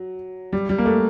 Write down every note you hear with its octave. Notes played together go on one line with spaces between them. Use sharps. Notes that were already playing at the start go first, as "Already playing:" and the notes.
Already playing: F#3
G3
G3
A#3
A3